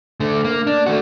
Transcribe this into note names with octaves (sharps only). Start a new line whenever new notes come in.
D3 A3
A#3
D4
A3 F#4